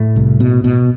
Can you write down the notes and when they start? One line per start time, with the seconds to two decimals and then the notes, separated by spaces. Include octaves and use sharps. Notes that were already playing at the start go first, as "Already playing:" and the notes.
Already playing: A2 A3
0.16 C2
0.40 B2
0.64 B2